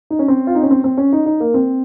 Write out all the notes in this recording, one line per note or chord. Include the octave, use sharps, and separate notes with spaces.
D#4
C#4
C4
F4
D#4
C#4
C4
C4
C#4
D#4
D#4
A#3
C4